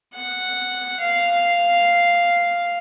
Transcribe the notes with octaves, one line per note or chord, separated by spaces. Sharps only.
F#5
F5